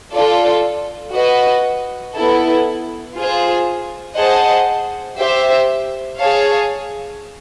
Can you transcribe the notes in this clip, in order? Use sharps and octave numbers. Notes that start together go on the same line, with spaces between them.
F4 A4 D5
F#4 B4 D#5
B3 E4 A4
F4 G#4 C5
G#4 C5 D#5 F#5 A5
G4 C5 E5
G#4 C#5 F5 A5